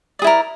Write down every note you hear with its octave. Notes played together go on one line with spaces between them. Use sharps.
E4 G#4 A#4 D5